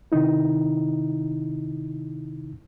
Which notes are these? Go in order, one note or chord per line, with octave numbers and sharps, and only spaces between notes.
C3 D#3 D#4 E4